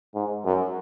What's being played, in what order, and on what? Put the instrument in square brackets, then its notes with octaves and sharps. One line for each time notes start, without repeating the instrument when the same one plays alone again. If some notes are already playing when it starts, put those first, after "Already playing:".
[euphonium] G#2
F#2